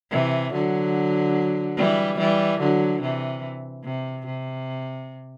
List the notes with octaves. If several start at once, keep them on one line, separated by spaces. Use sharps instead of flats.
C3 E3
D3 F#3
E3 G3
E3 G3
D3 F#3
C3 E3
C3
C3